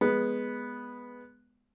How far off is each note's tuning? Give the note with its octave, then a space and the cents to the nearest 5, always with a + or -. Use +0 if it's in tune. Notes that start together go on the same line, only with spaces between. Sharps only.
G#3 +0 B3 -5